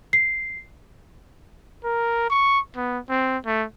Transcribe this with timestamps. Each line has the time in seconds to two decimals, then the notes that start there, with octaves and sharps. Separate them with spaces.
0.13 C7
1.84 A#4
2.30 C#6
2.76 B3
3.09 C4
3.46 A3